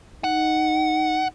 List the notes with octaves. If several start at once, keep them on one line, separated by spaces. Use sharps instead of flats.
D#4 F#5